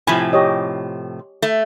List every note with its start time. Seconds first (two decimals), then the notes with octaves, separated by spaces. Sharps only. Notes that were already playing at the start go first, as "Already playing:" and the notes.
0.07 A2 C3 F3 G#5 B5
0.33 G4 C#5 D#5
1.42 A3